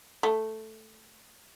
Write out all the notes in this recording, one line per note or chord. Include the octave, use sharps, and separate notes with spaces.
A3